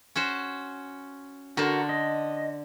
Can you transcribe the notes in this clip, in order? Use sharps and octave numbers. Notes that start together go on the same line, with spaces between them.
C#4 F#4 C5
D3 D4 F#4 A#4 C5
D#5